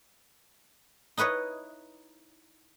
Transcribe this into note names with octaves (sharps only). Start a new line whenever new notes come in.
D#4 E4 B4 C#5 D#5